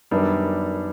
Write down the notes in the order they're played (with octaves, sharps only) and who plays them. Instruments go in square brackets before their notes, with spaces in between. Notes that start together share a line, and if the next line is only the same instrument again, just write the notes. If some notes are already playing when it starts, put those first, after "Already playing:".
[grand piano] F#2 D#3 G3 B3 D4